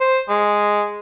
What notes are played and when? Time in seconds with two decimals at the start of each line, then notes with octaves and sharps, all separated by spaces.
0.01 C5
0.29 G#3